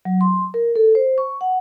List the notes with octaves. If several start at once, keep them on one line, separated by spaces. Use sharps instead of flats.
F#3
C6
A#4
A4
C5
C#6
F#5